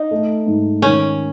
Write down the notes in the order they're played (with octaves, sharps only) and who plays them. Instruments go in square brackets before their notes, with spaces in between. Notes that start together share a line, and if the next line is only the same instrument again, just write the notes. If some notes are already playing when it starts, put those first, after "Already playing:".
Already playing: [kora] D#4
[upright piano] A3
G#2
[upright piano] D#3 [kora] C#4